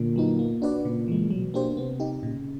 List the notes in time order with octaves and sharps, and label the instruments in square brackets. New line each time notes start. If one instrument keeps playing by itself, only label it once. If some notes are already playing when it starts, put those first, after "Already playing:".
Already playing: [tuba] A#2 [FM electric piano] D3
[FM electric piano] F#3 B3 D#4
A#3
D4 F#4 B4 D5
[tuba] A#2 [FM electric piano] C#3
[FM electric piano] E3 G#3
[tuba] B2 [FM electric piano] F#3
[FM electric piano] A#3 D4 G4 C5
[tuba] C3 [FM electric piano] B3
[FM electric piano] D#4 G4
[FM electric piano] A#2 [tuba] C#3